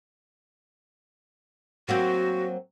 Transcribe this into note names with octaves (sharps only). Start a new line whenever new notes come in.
F#3 A#3 C4 F#4